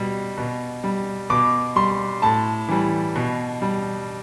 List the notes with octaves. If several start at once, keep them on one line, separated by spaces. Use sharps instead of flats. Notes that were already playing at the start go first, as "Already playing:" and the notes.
Already playing: B2 G3
B2
G3
B2 D6
G3 C6
A2 A5
E3 G3
B2
G3